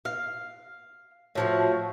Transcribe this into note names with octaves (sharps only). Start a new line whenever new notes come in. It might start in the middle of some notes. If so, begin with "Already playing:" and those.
F5
A2 F3 F#4